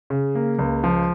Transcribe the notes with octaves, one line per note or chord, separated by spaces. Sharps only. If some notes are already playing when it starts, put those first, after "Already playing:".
C#3
A#3
C#2
F3